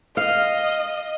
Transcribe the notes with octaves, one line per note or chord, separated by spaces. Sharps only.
D#5 F5